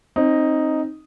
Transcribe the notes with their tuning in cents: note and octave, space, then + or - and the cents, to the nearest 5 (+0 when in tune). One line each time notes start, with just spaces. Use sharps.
C4 +30 D#4 +0